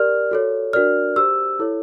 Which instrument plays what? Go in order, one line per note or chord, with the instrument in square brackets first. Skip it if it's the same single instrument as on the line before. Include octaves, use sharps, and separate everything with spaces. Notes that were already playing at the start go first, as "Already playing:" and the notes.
Already playing: [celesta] G4 A#4 D5 F6
F#4 A4 C#5
D4 F#4 A#4 D5 F6
G4 C5 E6
E4 A4 C#5